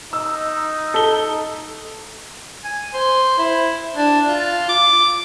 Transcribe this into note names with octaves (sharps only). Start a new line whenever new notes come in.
D#4 E6
A4 G7
G#5
C5
E4
D4
F4
D6